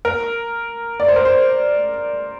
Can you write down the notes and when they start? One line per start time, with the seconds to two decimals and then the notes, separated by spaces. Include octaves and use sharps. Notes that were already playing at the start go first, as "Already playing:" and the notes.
0.05 A#4
1.00 D5
1.08 C5
1.16 A#4
1.25 C5